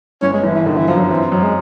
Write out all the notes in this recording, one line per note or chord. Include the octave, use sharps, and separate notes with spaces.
G1 C#4
G#3
G1 E3
E3
D3 D#3
E3
F#2 F3
F#3
F3
E3 C4
F#2 F#3
G#3